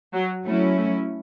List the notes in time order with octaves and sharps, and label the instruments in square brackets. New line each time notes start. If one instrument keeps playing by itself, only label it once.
[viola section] F#3
[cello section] F#3 C#4 E4 [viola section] A3
[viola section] A3